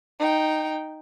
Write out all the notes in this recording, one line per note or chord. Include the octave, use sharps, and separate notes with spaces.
D#4 G5